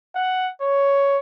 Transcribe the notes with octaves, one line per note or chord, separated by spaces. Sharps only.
F#5
C#5